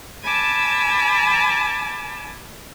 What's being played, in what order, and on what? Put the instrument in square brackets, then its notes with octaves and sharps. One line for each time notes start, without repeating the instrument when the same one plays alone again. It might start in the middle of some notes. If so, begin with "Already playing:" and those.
[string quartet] G#5 A5 B5 D6 E6